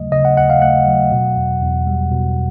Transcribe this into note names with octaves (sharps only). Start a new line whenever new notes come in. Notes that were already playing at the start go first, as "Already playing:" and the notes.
Already playing: D#2 C#3 F#3 A3 D#5
C#3 D#5
F#5
D#2 F#5
F5
A3 F#5
F#3
B2
E2
E2
G3
B2